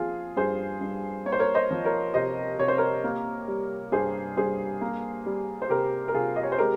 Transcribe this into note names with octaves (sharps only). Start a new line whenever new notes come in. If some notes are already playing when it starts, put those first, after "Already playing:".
Already playing: F3 A#3 F4 G#4
G2 G#4 C5
G2
A#3 C#5
C5
A#4 C#5
C5 D#5
F3
A#4 C#5
C3 C5 D#5
C3 C#5
C5
A#4 C#5
A#3
G3
G2 G#4 C5
G2 G#4 C5
A#3
G3
C5
C3 G4 A#4
A#4
C3 F4 G#4
D#5
C#5
C5
G#3 G4 A#4